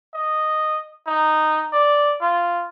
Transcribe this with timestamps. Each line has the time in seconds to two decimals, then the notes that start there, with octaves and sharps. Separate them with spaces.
0.14 D#5
1.07 D#4
1.73 D5
2.22 F4